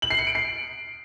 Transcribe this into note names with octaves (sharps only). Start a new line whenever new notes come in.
F#7
C7
C#7
D7
C7